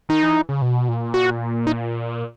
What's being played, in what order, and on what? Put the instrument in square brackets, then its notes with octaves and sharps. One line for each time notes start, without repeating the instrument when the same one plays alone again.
[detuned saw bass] D#3 [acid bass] D#4
[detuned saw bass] E3
C#3
B2
A#2
[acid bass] F#4
D#4